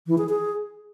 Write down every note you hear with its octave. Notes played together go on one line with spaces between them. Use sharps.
E3
G#4
G#4